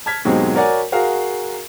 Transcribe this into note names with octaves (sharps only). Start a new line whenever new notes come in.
A5 F6 G#6 B6
D#2 G#2 B2 F#3 G#3 C4
F#4 A#4 C#5 D5 F#5 G#5
F#4 G#4 A#4 F5